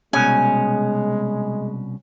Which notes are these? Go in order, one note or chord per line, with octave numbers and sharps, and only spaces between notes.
C2 B2 G#3 C#4 G#5